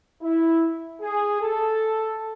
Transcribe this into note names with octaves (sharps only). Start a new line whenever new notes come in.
E4
G#4
A4